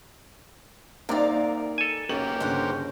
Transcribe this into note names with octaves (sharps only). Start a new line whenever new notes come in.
C2 C3 A#3 D#4 A#4 D5 F5
A4 G#5
B1 A#3 C#4 G4 F#7
G1 C#3 C5 F#5